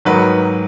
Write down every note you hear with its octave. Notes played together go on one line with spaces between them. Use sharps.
G#2 D#3 F#3 B4